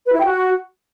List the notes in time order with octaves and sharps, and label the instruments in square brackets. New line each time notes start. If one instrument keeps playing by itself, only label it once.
[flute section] B4
E4
G5
F#4